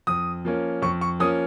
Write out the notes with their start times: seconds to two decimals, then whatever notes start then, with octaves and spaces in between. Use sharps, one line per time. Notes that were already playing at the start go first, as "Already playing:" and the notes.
0.07 F2 D#6
0.45 F3 A#3 C#4
0.82 F2 C#6
1.01 C#6
1.20 F3 A#3 C#4 D#6